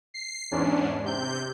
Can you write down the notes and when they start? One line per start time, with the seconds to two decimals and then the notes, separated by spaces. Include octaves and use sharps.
0.14 C7
0.51 E2 G#2 C#4 D4
1.04 C3 G6